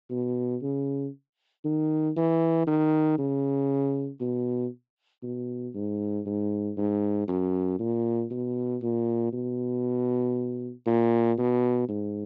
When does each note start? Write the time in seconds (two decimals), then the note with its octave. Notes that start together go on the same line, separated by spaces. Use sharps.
0.10 B2
0.62 C#3
1.64 D#3
2.16 E3
2.67 D#3
3.18 C#3
4.21 B2
5.23 B2
5.75 G#2
6.26 G#2
6.77 G#2
7.28 F#2
7.79 A#2
8.31 B2
8.82 A#2
9.33 B2
10.87 A#2
11.38 B2
11.89 G#2